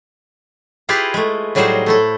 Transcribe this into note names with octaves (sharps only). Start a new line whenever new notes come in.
E4 F4 G4 G#4 B4 A#5
G#3 A3
A2 F#3 G3 D#4 G#4 C5
A3 E4 A4